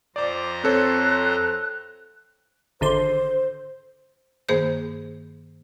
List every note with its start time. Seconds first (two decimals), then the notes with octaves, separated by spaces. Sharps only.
0.16 F2 C5 D5 A#5 D6
0.64 C4 A4 C#5 F#6
2.81 G#1 D3 C5 C6
4.49 G2 D#3 A#3 G#4 C5 G6